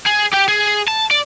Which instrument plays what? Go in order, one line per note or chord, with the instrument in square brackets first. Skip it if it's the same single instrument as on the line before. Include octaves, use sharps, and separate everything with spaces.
[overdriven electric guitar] G#4
G4 G5
G#4
A5
D5